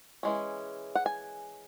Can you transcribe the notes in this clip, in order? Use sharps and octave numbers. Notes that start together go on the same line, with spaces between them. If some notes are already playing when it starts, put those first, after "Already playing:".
E3 G#3 C#4
F#5
G#5